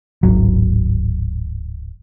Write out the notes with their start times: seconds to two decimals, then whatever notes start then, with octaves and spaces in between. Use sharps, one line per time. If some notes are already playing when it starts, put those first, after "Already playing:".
0.23 D1 G#1 F#3